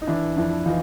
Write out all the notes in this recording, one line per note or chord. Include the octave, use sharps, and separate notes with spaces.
D#4
E3 D4 E4
F2 D4 E4
E3 D#4 F4